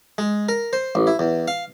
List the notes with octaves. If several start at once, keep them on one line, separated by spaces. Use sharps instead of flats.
G#3
A#4
C5
A1
E4
E2
F5